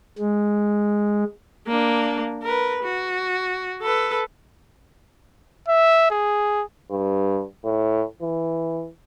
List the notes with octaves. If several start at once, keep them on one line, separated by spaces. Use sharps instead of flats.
G#3
A#3 D4
A#4 B4
F#4
A4 B4
E5
G#4
G2
A2
E3